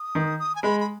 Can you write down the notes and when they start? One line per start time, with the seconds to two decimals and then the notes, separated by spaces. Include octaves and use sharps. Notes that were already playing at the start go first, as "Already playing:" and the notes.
Already playing: D#6
0.15 D#3
0.39 D#6
0.55 G#5
0.63 G#3 B5
0.80 B5